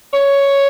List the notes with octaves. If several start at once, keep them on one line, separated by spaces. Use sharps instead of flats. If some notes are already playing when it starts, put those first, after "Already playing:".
C#5